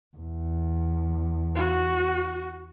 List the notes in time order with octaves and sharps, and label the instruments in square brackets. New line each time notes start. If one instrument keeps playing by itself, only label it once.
[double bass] E2
[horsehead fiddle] F#4